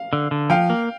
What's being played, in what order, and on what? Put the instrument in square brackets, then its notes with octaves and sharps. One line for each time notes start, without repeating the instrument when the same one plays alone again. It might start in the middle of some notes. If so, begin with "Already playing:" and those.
Already playing: [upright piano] F5
[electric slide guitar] D3
D3
[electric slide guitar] F3 [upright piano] F5 G5
[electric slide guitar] A#3